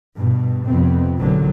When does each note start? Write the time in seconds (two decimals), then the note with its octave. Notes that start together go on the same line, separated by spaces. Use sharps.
0.16 G2 B2
0.66 F2 C3 B3 C4
1.19 A1 E2 B2 D3 D#3 F#3